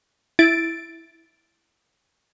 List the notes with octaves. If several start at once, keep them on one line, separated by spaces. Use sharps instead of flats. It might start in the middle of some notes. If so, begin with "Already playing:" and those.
E4 A6 D7